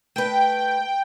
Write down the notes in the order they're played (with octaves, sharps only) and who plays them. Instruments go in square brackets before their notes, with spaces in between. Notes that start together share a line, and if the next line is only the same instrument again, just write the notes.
[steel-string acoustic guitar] A3 B4 [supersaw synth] G5